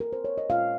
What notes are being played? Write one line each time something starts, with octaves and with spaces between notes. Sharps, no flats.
A#4
C5
C#5
D#5
A#2 G#3 C#4 F4 F5